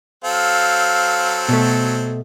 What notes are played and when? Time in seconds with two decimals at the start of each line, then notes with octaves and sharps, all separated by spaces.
0.24 F#3 C4 A4 F5
1.49 B2 A3